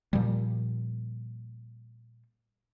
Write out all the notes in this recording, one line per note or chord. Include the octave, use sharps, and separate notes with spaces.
A#2 F3 G3